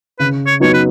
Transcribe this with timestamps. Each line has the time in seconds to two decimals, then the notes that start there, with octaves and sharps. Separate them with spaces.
0.19 C#3 B4
0.46 C#5
0.60 F#3 B3 D#4 C#5
0.74 B4